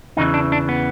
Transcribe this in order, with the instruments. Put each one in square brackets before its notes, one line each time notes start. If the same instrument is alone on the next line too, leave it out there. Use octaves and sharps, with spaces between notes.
[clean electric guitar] E2 C#3 E3 D#4
D4
D4
B3